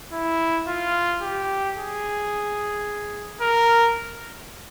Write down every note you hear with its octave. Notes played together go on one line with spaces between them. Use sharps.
E4
F4
G4
G#4
A#4